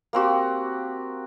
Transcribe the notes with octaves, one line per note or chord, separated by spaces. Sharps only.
A#3 C4 F#4 G4